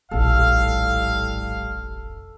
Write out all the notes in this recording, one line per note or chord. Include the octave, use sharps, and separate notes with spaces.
F1 A#1 A2 G3 A4 F5